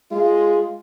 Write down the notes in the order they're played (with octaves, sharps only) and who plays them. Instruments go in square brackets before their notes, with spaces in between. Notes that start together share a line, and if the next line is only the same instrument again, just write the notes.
[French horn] G#3 [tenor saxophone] F4